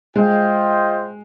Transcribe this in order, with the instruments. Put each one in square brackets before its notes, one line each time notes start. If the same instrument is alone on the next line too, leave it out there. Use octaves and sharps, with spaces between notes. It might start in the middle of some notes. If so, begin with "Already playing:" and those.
[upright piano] G#3 [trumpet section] F4 C5 D#5 G5